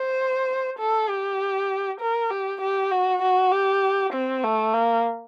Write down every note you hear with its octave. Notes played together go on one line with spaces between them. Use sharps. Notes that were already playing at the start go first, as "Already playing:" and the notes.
Already playing: C5
A4
G4
A#4
G4
G4
F#4
F#4
G4
C4
A3
A#3